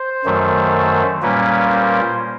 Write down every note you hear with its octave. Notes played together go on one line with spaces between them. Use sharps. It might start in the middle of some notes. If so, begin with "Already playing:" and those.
Already playing: C5
F#2 D#3 F#3 A3
A#2 G3 A#3 C#4 B4
C5